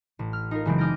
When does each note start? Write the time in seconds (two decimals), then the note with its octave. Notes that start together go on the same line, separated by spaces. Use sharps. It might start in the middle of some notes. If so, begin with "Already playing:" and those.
0.19 A1
0.33 F6
0.51 D#4 F4 A#4
0.65 F#1 C#3 E3 G#3 C4
0.78 D6 D#6 F6 G6 A#6 D7